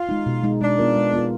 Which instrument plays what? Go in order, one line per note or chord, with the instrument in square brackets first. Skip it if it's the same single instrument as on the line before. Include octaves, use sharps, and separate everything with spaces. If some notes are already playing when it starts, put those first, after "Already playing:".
Already playing: [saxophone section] F4
[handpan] G#3 D#4
B2
G#3 D#4
[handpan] G#3 [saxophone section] D4
[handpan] B3 F4 A#4
G#3
B3 F4 A#4